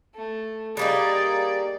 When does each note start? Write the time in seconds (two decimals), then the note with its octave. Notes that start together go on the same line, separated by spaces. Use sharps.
0.14 A3
0.77 G3 A#3 D#4 G#4 D5